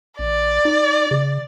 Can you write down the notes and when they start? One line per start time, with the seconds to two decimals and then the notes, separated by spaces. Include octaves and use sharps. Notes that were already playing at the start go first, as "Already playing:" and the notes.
0.19 A#1 D5
0.65 D#4
1.11 C#3